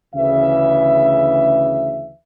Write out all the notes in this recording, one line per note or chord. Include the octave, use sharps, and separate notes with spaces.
D2 C#3 E3 E5